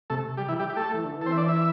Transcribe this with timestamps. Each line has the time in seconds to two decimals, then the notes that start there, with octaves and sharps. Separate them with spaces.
0.10 C3 A3 A4
0.37 G3 G4
0.48 E3 E4
0.59 G3 G4
0.70 G4
0.76 A3 A4
0.94 E3
1.05 D3
1.15 E3
1.21 A4
1.26 C4 C5
1.32 E5
1.37 D4 D5
1.48 E4 E5